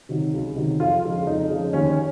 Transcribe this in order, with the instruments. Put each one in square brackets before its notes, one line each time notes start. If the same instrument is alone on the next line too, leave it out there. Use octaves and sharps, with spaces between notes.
[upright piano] C3 D#3 F#3
C#2
C3 D#3 F#3
F2 F4
C#3 F3 G#3
F2 D#4
C#3 F3 G#3
D#2 C#4
C#4